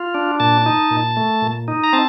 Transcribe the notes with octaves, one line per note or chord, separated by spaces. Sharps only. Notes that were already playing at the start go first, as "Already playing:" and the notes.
Already playing: F4
D4
A#2 A5
D#4
A#2
A3
A#2
D#4
A#5
C4 A5